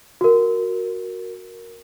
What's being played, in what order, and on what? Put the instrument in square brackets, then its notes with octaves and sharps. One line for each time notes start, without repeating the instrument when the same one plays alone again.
[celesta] F#4 A#4